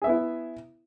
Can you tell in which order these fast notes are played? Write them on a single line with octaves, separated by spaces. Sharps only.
G#4 E5 B3 E4